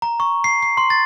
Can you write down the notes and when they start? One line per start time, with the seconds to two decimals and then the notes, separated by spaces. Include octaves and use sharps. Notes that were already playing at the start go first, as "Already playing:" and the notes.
0.02 A#5
0.20 C#6
0.44 C7
0.63 C7
0.77 C6
0.90 A6